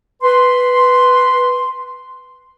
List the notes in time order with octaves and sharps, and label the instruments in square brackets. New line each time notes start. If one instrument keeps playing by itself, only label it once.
[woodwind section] B4 C6